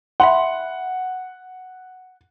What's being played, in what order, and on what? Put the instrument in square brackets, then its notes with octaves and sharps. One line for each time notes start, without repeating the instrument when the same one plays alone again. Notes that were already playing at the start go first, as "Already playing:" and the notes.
[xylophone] E5 B5 C6 [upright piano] F#5